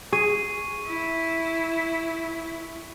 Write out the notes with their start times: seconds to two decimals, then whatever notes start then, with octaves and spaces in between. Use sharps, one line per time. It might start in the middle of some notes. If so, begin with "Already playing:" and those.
0.13 G#4 C#6 D#7
0.87 E4